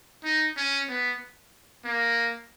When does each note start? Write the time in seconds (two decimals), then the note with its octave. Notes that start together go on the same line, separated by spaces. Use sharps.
0.24 D#4
0.57 C#4
0.89 B3
1.85 A#3